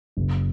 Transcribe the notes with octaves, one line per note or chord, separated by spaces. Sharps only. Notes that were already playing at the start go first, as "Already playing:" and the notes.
F#1